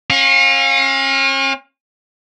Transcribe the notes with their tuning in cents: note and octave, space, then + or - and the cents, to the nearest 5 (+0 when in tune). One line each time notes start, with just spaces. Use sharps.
C#4 -40 F5 +25